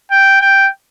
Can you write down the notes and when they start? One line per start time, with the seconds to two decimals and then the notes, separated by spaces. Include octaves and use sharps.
0.11 G5
0.41 G5